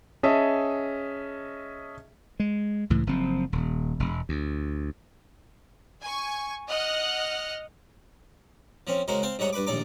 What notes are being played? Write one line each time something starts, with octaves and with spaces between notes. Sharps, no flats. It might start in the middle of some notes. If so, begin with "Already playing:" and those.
C#4 G#4 D#5 E5 A5
G#3
C#2 A2 E3
F#1 F3 C4
D#1
E1
D2
G#5 C#6
D#5 F#5 F6 F#6
F3 C4 C#4
C#3 G#3 F#4 A#4 C5
C4 F5 G5 A5
G#2 G3 C#5 D#5 F#5 A#5
G2 B4 B5 D6
A#1 D#2 A2 D5 A#5 D6